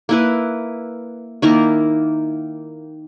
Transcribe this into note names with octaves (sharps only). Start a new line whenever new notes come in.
A#3 E4 B4
D#3 A#3 E4 A#4